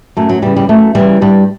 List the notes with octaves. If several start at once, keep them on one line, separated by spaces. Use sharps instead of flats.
F#2 A3
F#3
C#3 E3 G3
G3
F#2 A3
C#3 E3 G3
G2 G3